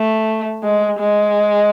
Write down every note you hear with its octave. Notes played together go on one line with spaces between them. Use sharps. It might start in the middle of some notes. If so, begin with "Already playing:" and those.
Already playing: A3
G#3
G#3